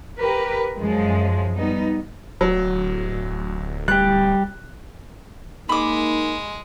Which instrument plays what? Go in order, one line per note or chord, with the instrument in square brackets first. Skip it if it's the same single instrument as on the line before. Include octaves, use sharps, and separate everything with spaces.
[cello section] G4 A#4 B4
F#2 F3 G#3
G3 B3 D#4
[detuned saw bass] D1 [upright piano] F#3
[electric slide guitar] G3 G4 [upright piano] F#6
[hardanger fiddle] G#3 [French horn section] A#3 D#4 [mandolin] B5 D6